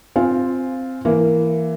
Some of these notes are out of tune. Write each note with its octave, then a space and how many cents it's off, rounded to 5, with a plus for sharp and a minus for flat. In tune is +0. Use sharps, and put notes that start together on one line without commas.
C4 +0 F4 +0 G#5 +0
E3 +10 A#3 -5